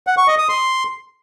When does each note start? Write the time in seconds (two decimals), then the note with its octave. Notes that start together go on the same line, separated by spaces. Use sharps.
0.07 F#5
0.17 C#6
0.28 D#5
0.38 D#6
0.49 C6